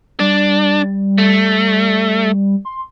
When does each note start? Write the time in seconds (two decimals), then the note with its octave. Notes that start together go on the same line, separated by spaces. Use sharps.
0.20 G3 D4
1.18 A3
2.65 C6